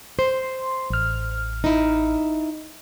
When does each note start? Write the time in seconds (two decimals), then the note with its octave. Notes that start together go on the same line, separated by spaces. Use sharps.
0.19 C5 C6
0.90 A1 F6
1.64 D#4 E4